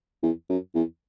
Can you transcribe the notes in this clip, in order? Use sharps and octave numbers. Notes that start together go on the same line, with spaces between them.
E2
F#2
E2